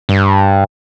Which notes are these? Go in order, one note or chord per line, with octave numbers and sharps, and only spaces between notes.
G2